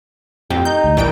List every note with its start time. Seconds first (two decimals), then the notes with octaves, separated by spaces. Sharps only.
0.50 F2 G4
0.65 D#4 G6
0.84 D2
0.97 A#1 D#3 E3 G3 G5 D7